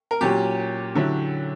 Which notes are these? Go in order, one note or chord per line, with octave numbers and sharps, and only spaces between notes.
A#4
A#2 F#3 C#4 G4
D3 F#3 C#4 E4